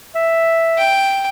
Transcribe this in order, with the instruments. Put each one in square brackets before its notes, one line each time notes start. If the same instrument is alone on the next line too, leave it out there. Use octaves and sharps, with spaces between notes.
[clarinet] E5
[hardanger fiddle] G5